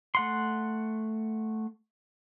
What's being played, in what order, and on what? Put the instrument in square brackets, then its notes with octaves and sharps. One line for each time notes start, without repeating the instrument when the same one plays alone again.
[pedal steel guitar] A3 F#5 C6